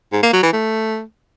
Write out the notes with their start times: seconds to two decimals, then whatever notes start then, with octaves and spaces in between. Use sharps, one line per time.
0.13 G#2
0.23 A#3
0.33 F#3
0.43 E3
0.53 A3